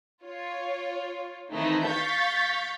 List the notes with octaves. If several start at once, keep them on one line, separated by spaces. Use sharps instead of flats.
F4 C#5
D#3 E3 A3 C4 D#4 E4
F5 C#6 G6 A6 B6